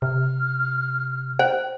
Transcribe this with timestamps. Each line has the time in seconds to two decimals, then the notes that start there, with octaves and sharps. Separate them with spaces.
0.02 C3 F6
1.39 C5 G5